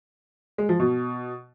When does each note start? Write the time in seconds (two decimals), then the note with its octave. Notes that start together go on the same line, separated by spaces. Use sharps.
0.58 G#3
0.69 F3
0.80 B2